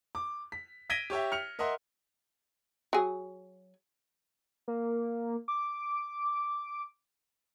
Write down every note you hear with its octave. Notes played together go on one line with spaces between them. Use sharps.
D6
B6
G#6 A#6 B6 D7 D#7 G7
G4 C#5 E5 G5
F6 C#7 F7
A#4 D#5 E5 F#5 C6
F#3 G#4
A#3
D6